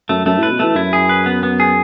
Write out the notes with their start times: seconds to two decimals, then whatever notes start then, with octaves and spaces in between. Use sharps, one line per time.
0.09 F#2 A3
0.25 F#2 A3
0.39 A2 B4
0.51 B2
0.59 E3 A3
0.76 F#2 E4
0.93 G#4
1.09 B4
1.26 B3
1.43 B3
1.60 G#4